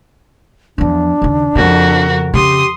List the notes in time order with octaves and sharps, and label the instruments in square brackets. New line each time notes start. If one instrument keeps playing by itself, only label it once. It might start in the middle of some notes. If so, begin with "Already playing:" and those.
[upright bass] E2 F3 [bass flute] D4
[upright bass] D#2 C#3
[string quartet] F2 F#4 A#4 [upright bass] C#3
[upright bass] C#3 [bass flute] G4 [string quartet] C6 D#6